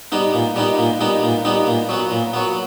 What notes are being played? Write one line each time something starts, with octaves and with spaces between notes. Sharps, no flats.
G3 B3 D#4
A#2
G3 B3 D#4
A#2
G3 B3 D#4
A#2
G3 B3 D#4
A#2
F#3 B3
A#2
F#3 B3